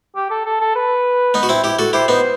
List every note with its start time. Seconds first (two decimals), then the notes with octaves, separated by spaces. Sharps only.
0.16 G4
0.30 A4
0.45 A4
0.61 A4
0.76 B4
1.34 B3 D#4
1.43 F#4
1.49 C4 E4
1.64 E4 G4
1.79 F#4 A4
1.93 E4 G4 C5
2.08 B3 D#4